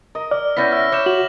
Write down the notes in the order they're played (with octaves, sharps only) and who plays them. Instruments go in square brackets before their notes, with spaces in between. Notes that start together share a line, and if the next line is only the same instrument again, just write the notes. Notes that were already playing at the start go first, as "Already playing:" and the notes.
[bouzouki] A#4 [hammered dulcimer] D#5
[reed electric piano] D5 [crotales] F6
[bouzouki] B3 C#4 [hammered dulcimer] E4 [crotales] G6 A#6 B6
[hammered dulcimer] E5 [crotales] F6 A#6
[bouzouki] C#5 [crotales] D6 G6 E7
[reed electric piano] F#4 [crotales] F#7